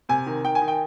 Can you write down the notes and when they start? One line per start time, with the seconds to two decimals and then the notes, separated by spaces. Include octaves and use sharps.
0.09 C3 G#5
0.26 D#3
0.44 D#3 G5
0.55 G#5
0.61 D#3
0.68 G5